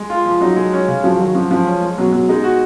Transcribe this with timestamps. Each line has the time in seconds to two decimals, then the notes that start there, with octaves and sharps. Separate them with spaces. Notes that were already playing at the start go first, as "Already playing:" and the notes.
Already playing: G#3
0.10 F4
0.26 F3
0.41 F#3 D#4
0.56 G#3
0.73 C#4
0.88 C#3
1.03 F3 F#3
1.20 D#3 F#3
1.34 F3 F#4
1.51 F3 G#3
1.67 C#4
1.81 G#3
1.97 B2 F#3
2.12 B2 F#3
2.29 G#3 D#4
2.44 F#4